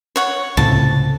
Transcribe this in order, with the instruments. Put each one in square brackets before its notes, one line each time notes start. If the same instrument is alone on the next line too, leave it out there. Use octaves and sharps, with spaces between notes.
[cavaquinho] C#5 F#5
[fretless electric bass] C#2 A2 C3 [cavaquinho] A5